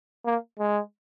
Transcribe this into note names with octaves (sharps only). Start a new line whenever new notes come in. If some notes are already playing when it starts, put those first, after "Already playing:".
A#3
G#3